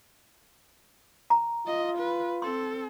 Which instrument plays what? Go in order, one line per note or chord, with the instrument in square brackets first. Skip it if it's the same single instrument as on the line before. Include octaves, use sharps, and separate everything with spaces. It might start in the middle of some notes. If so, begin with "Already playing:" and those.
[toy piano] A#5
[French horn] F4 [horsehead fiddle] D#5
[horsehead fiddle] B4
[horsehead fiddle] C4 A4 [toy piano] C6